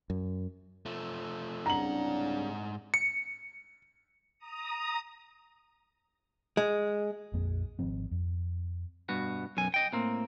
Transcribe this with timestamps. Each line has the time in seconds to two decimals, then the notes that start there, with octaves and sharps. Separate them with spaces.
0.10 F#2
0.86 F3 A3
1.66 C2 G#2 C#3 D4 F#5 A#5 F#7
2.94 C#7
4.39 A#5 D#6
6.57 G#3
7.33 A#1 F2 A#3
7.79 G#1 F3 C4
8.11 F2
9.09 G2 B2 F#4
9.57 B1 F#2 G#5
9.74 D#5 G5
9.93 A2 A#3 C4